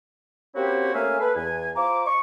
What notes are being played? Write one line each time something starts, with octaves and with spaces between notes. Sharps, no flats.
A#3 C4 C#4 E4 F#4 G4
A3 A#3 C#4 E5 F5 G#5
A4 B4
E2 G#5
F4 C5 A#5 D6
D#5 C#6